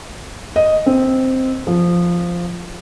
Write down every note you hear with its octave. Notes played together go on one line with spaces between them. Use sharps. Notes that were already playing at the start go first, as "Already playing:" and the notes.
D#5
C4
F3